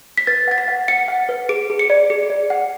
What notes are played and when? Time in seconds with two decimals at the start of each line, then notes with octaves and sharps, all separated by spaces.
0.17 B6
0.27 B4 A6
0.48 F#5 A6
0.58 B6
0.68 F#5
0.88 F#5 C#7
1.08 F#5
1.29 B4
1.49 G#4 D7
1.70 G#4
1.79 C#7
1.90 D5
2.10 G#4 C#7
2.30 D5
2.50 F#5